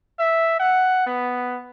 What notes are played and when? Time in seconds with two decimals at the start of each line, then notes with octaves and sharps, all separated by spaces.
0.19 E5
0.60 F#5
1.07 B3